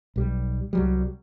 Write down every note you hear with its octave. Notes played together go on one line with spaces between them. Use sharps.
B1 G3
C2 F#3 G3